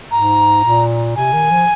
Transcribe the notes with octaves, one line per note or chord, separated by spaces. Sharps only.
G#2 A#5
A#2
C3 G#5
D#3
F3